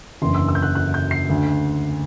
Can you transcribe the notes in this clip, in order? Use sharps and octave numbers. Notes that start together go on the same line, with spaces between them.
F#1 E2 D3 C6
E6
E6
G6
F#6
F#6
G6
C7
D2 D3